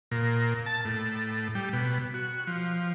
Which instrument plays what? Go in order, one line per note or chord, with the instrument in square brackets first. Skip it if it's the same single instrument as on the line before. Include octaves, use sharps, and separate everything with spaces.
[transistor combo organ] A#2
A5
A2
G3
B2
F#4
F3